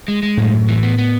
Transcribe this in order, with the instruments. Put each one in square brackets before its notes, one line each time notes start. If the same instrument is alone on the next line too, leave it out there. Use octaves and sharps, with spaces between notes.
[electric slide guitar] G#3
G#3
[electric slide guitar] F#2 [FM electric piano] A2
[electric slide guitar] F#2
E3
B3
B3